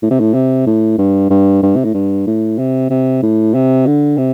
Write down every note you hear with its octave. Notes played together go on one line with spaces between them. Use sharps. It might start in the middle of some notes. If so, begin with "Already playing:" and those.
A2
C3
A2
C3
A2
G2
G2
G2
C3
A2
G2
A2
C3
C3
A2
C3
D3
C3